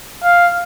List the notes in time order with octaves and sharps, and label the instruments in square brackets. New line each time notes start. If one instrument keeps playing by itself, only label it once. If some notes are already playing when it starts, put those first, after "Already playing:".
[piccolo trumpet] F5